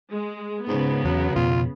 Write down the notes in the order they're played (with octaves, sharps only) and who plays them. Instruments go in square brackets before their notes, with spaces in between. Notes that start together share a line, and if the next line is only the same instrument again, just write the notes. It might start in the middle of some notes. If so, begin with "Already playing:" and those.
[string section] G#3
[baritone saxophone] G#2 [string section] C#3 B3
[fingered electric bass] E2 [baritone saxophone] F#3
[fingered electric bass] F2 B2 [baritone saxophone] F4